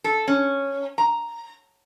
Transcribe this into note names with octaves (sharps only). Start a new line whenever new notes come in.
A4
C#4
A#5